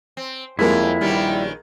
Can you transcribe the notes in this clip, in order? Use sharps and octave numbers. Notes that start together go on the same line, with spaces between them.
C4
F2 G3 G#3 A#3 C#4 E4 A#4
A#1 D#3 G3 B3 C#4